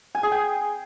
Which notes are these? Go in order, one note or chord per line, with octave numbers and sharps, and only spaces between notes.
G#5
G#4
G5